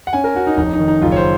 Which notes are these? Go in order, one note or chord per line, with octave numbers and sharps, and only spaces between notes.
F#5
C#4 G#5
A#4
C#4 F#4
D#4
F1 D#4
D#4
D#3
D#4
F#1 F4
C#5
C5